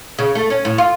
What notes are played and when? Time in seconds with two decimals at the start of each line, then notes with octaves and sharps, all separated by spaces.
0.19 C#3
0.35 A3
0.50 C#4
0.65 A2
0.78 F4